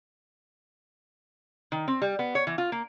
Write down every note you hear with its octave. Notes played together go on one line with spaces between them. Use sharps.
D#3
C4
G3
B3
C#5
E3
F4
A#3